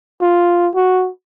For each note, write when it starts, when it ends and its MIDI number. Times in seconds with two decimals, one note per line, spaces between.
0.21 0.70 65
0.75 1.10 66